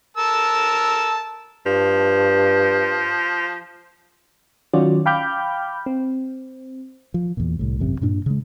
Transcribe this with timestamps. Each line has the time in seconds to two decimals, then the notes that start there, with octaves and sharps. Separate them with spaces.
0.17 A#4 A5 E6
1.66 G2 F3
4.73 D#3 F#3 C#4 F4 F#4 D5
5.06 F5 G5 B5 D6 F6 G6
5.86 C4
7.14 F3
7.37 E2 A#2
7.59 C2 A2
7.79 G#1 F#2 C3
8.01 G2 A#2 D4
8.26 C#3 G#3